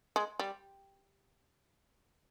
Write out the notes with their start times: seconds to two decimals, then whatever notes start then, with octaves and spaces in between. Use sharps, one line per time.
0.16 G#3
0.39 G3